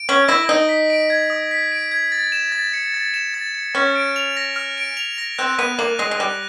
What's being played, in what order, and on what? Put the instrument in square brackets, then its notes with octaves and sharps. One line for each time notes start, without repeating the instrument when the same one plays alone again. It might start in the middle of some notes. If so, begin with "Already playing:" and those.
Already playing: [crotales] D7
[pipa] C#4 [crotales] F#7
[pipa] E4 [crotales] A#6
[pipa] D#4 [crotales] D#6
[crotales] B6
D7
G#6
D#6
B6
D7
G#6
A6
E7
A6
C#7
A6
E7
A6
C#7
[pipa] C#4 [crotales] F6
[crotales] D7
F7
A#6
F6
D7
F7
A#6
[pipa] C4 [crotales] F#6
[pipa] B3 [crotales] D#7
[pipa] A#3 [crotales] F#7
[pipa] G#3 [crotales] A#6
[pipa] G#3
[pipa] G3 [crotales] F#6